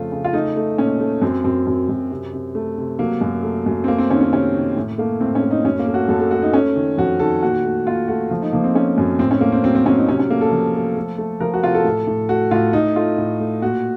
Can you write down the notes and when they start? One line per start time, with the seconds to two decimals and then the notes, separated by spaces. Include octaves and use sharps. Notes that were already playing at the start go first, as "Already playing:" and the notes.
Already playing: F2 C#3 A3 F4
0.12 C#3
0.24 F4
0.33 A3 D#4
0.56 A3
0.78 A#2 C#4
1.00 A3
1.22 F#2 C4
1.44 F#2 C4
1.67 F#2
1.89 F#2
2.11 C3
2.33 C3
2.55 A3
2.78 C3
2.99 F#3 A#3
3.21 F#2
3.43 A3
3.66 F#2
3.84 C4
3.88 A3 A#3
3.98 C4
4.10 D#3 C#4
4.21 C#4
4.32 C3 C#4
4.54 D#3
4.76 A2
4.98 A3 A#3
5.20 A2 C4
5.35 C#4
5.43 A3
5.51 D#4
5.65 F#2 C#4
5.79 A#3
5.87 A3
5.94 F#4
6.09 F#2 A4
6.20 A4
6.31 A3 F#4
6.42 D#4
6.53 A3 C#4
6.76 D#3
6.98 F2 F#4
7.19 D#3 A4
7.43 A#2 F#4
7.65 A3
7.87 A#2 F4
8.08 A3 F#4
8.31 F3
8.42 D#4
8.53 F3 A#3
8.64 C4
8.75 A3 C#4
8.98 F#2
9.19 A2 C4
9.31 C#4
9.41 A3 A#3
9.52 C4
9.64 F#3 C4
9.75 C4
9.85 F#3 C#4
9.97 D#4
10.08 C3 C#4
10.19 C#4
10.30 A3 A#3
10.41 A4
10.52 F3
10.75 A3
10.97 A3
11.18 A3
11.40 F3 A#4
11.54 F#4
11.62 C3 F4
11.75 A4
11.84 A2
12.07 A2
12.29 A3 F#4
12.51 A2 F4
12.73 A2 D#4
12.96 A3 F4
13.18 A2
13.40 A3
13.62 A#2 F#4